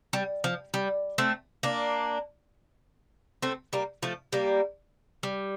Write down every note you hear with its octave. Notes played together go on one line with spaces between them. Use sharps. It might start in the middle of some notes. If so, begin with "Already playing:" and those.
G3
F3
G3
A3 C4
A#3 D4
A3 C4
G3 A#3
F3 A3
G3 A#3
G3